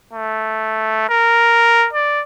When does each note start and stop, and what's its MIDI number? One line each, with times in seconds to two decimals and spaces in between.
0.13 1.07 57
1.09 1.87 70
1.93 2.21 74